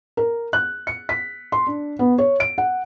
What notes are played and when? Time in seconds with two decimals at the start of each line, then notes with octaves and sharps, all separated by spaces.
0.17 A#4
0.53 F#6
0.87 C#7
1.09 B6
1.52 C6
1.67 D4
1.99 B3
2.18 C#5
2.40 D7
2.58 F#5